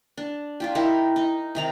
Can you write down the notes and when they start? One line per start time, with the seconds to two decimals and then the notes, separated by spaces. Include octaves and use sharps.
0.17 D4
0.60 D4 F4 G4
0.75 D#4 E4 G4 A#4
1.16 D#4
1.55 C3 D#3 A#5